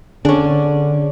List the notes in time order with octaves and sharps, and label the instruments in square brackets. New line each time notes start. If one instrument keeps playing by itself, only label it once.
[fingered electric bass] D3 [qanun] C#4 D4 [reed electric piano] G#4 C#5